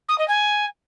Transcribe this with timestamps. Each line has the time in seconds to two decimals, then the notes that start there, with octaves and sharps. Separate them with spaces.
0.08 D#6
0.18 D#5
0.28 G#5